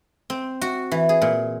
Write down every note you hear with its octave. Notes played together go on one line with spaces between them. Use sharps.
C4
F#4
E3
G#4
A#2